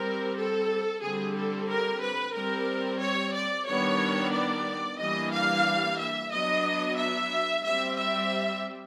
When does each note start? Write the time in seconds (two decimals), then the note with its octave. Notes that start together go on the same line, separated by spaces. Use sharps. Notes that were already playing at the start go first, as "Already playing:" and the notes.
Already playing: G3 C4 A#4
0.37 A4
1.02 D3 G3 C4 G#4
1.36 A4
1.69 A#4
2.02 B4
2.35 G3 C4 A#4
3.01 C#5
3.35 D5
3.67 D#3 G3 B3 D4 C#5
4.33 D5
4.99 E3 G3 A#3 D4 D#5
5.32 F5
5.99 E5
6.32 F#3 B3 D4 D#5
6.97 E5
7.64 G3 C4 E5
7.97 E5